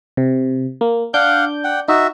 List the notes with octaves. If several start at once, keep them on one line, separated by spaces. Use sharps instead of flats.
C3
A#3
D4 F5 F#5 D6 G6
F#5 G5
D#4 F#4 E5